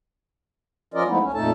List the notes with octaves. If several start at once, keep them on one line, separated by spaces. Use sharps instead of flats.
F3 C#4 F4 A#4 D5 D#5
F3 G#3 A3 B3 D#4 E4
D2 C#4
F2 A#2 A3 D#4 A4 A5